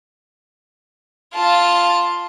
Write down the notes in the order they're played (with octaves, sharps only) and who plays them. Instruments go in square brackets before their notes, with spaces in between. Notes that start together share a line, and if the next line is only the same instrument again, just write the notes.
[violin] F4 A5